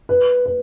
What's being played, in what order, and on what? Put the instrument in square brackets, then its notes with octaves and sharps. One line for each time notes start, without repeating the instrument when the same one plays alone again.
[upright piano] B4
B4